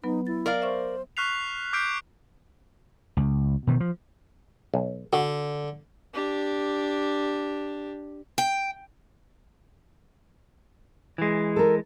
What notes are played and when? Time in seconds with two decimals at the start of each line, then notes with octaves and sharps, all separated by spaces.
0.03 F#3 B3 D#4 B4
0.27 E4 A6
0.46 A#4 D5 F5
0.62 C5 E5 C#6 F6
1.17 C#6 F6 F#6 B6 C7 F7
1.73 D6 F6 G6 B6 C7 D7
3.17 C#2
3.67 B2 D#3 E3
3.80 F3
4.74 B1
5.13 D3 F#4
6.14 D4 G4
8.38 G5
11.18 E3 G#3
11.56 A4 A#4